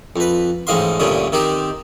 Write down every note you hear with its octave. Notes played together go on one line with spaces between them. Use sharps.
F2 B4
A1 G#2 G#3 D#5 F5 C6
D2 G2 A#2 D3 C#4 D#6
D#3 C4 D#4 G4